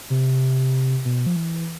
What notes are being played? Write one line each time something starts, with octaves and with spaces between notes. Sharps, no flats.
C3
B2
F3
E3